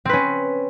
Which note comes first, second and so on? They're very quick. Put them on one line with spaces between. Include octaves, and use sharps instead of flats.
C4 B4 C#4